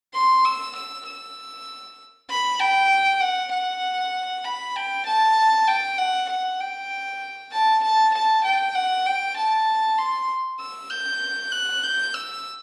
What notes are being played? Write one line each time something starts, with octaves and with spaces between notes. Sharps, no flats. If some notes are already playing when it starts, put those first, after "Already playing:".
C6
E6
E6
E6
B5
G5
F#5
F#5
B5
G5
A5
G5
F#5
F#5
G5
A5
A5
A5
G5
F#5
G5
A5
C6
E6
G6
F#6
G6
E6